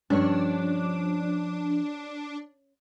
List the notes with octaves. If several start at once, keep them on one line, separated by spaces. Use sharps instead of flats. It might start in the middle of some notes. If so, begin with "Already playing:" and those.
G2 F3 C#4 D4 C#5